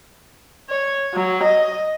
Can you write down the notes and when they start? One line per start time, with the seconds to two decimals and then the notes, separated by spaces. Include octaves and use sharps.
0.69 C#5
1.14 F#3
1.43 D#5